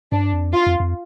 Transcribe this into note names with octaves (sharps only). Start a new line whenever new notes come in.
G2 D4
F2
F4
F2
F2